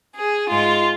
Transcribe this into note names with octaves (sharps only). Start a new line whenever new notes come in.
G#4
G#2 G#3 F4